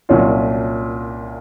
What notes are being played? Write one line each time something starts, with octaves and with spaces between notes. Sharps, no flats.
C2 A#2 F#3 C#4 F4